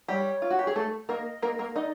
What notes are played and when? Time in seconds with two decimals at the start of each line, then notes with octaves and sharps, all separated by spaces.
0.08 G3 G4 C#5
0.42 F4
0.50 F#4
0.59 G4
0.67 G#4
0.76 A3 A4
1.09 A#3 A#4 D#5
1.42 A#3 A#4
1.59 A#3 A#4
1.75 D#4 D5 D#5